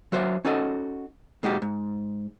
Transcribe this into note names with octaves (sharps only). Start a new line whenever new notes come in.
F#3 F#4 C5 C#5 E5
C#4 D#4 F#4 A4 D#5
A#2 G#3 D#4 F#4 G4
G#2